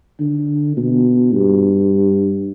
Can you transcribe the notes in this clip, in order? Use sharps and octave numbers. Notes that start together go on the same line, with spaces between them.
D3
B2
G2